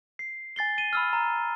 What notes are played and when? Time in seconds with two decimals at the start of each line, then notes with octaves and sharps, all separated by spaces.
0.19 C7
0.56 G#5 A6 C7 G7
0.78 D#7 G7
0.93 B5 E6 F6
1.13 A#5